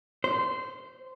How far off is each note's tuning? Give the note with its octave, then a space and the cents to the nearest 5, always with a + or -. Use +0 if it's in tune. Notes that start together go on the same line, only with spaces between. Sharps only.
C5 -15